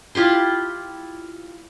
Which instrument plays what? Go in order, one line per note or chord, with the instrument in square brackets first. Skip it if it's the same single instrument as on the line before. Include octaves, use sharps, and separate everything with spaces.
[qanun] E4 F4 G4 C6